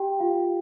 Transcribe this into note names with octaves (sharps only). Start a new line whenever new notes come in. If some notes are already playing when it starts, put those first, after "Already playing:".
Already playing: G4 G5
F4 F5